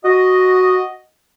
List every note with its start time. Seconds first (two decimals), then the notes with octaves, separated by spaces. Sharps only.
0.04 F#4 D#5